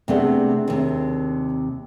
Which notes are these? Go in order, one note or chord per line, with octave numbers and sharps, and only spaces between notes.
C3 A3 B3 C4 D4 G#4
D#2 C3